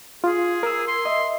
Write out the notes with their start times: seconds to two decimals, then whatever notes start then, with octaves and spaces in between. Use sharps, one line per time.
0.24 F4 G#4
0.63 A#4 E6
0.88 C6
1.05 D#5 E5